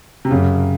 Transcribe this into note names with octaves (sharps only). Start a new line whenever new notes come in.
C3
F#2 C#3